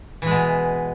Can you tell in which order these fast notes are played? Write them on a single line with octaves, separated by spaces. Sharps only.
E3 G#3 B2